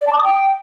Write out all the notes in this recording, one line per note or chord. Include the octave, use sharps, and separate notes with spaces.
D5
A5
D6
D#6
G5